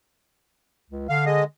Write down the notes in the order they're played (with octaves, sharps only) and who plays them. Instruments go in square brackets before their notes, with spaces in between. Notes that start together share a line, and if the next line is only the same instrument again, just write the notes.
[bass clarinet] C#2
[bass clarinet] D3 [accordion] F5
[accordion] G#3 D#5